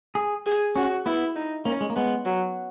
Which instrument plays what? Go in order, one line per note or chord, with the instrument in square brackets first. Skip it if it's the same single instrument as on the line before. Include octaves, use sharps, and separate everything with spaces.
[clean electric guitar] G#4
[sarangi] G#4
[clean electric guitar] C#4 [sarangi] F#4
[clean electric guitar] B3 [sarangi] E4
[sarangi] D#4
[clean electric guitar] A#3 [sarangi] C#4
[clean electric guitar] G#3
A#3
[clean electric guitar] G#3 [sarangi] B3
[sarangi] F#3